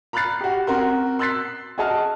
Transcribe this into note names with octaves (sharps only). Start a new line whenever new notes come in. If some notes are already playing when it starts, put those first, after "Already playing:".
A#5 B5 F6 F#6 A6 C7
F#4 G4
C4 F#4 A#4 C6
C6 E6 F#6 A6 B6 C7
F#4 G#4 D#5 G#5 A5 F6